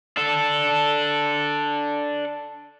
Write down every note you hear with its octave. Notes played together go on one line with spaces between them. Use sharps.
D4 A4